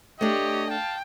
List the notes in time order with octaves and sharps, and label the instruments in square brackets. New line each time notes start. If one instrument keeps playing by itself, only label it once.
[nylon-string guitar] A3 D4 [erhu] G4 [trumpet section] C#5 D#5
[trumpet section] F5 A5 [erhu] G5